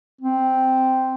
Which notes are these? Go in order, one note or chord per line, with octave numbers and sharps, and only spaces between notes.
C4